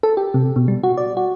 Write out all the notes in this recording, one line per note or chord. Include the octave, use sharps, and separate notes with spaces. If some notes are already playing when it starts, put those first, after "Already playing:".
A4
G4
C3
B2
G3
F#4
D5
F#4